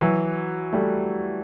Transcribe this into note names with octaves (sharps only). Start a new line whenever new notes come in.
E3 F#3
G3 A3